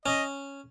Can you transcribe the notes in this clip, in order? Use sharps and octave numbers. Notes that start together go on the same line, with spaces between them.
C#4 D#5